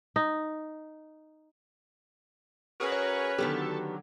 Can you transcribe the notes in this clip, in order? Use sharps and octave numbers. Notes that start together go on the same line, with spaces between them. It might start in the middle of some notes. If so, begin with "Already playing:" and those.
D#4
C#4 F#4 G#4 A#4 B4
C#5
D3 D#3 F#3 B3 G4 A4